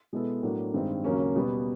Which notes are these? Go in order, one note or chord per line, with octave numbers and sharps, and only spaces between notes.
B2 G#3 B3 E4 A4
A2 F#3 A#3 D4 F#4
G2 D#3 G#3 C4
D#2 C#3 F#3 A#3 C#4
B2 G3 B3